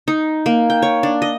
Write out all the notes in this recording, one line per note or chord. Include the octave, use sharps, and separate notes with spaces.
D#4
A#3
G5
C#5
D4
D#5